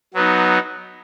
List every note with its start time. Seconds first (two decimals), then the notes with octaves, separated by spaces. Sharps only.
0.14 F#3 B3 D#4